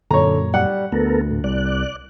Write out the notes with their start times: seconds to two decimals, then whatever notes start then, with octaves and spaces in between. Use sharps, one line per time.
0.11 F#2 A#2 D3 C#5 A#5
0.54 G3 F#5
0.92 D2 B3 A4 A#4
1.31 A2
1.44 C2 D5 F#6